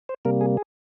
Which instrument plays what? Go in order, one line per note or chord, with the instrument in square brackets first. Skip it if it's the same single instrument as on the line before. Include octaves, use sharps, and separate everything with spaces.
[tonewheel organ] C5
C3 G3 A#3 A#4
G#4
G#4